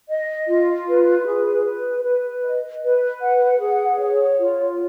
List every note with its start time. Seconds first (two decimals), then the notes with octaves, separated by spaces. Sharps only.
0.09 D#5
0.48 F4
0.88 B4
1.27 G#4
1.65 B4
2.05 B4
2.43 D#5
2.83 B4
3.21 F#5
3.60 G#4
3.99 C#5
4.38 F4